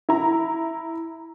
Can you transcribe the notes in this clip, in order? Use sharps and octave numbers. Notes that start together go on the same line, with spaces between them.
E4 A#5